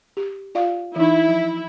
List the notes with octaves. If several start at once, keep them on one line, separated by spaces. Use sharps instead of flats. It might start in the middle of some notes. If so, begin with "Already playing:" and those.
G4
F4 D5 F5
E3 D#4 E4
F3